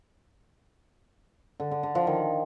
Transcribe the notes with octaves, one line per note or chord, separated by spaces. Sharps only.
D3
D3
D3
F3
D#3